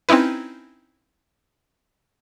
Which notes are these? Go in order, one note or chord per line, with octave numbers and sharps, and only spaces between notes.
C4 C#4 D#4 E4 B4